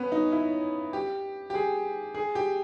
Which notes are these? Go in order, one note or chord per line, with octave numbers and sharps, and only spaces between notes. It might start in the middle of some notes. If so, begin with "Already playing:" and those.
Already playing: B3 C#4
D#4
E4
G4
G4
G#4
G#4
G4